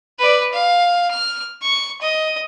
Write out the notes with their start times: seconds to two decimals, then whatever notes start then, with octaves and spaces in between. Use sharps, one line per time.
0.19 B4 D5
0.53 F5
1.11 F6
1.62 C#6
2.01 D#5